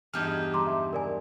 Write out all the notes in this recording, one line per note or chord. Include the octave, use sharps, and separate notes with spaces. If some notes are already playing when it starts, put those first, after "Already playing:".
E2 G2 D#4 F6 G6
A#5 C6 D6
E5
A#4 D5 G#5